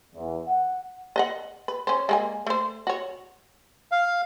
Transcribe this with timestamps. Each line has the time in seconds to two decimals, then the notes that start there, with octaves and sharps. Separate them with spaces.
0.14 E2
0.47 F#5
1.16 B4 D#5 F#5
1.68 B4
1.87 C#4 C5
2.09 G#3 A#3 G#5
2.47 A3 C5
2.87 F#4 C#5
3.92 F5